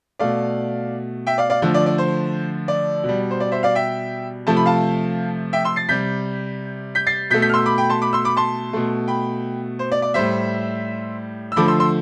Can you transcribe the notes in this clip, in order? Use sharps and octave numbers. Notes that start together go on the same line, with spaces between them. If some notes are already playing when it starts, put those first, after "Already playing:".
B2 A3 D5 F5
E5 G5
D5 F5
D5 F5
D3 F3 A3
D5
D5
C5
D5
B2
G3
C5
D5
C5 E5
D5 F5
E5 G5
C3 F3 A3 A5
B5
F5 A5
E5 G5
C6 E6
A6 C7
C3 G3 G6 B6
G6 B6
A6 C7
B2 A3 G6 B6
G6 B6
F6
C6 E6
B5 D6
G5 B5
A5 C6
B5 D6
C6 E6
B5 D6
A5 C6
B2 A3
G5 B5
C5
D5
D5
A2 G3 C5 E5
E6
D3 F3 A3 B5 D6
C6 E6
C6 E6